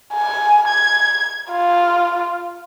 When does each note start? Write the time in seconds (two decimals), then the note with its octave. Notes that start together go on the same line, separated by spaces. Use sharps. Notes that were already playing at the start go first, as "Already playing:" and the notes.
0.14 G#5
0.68 G#6
1.51 F4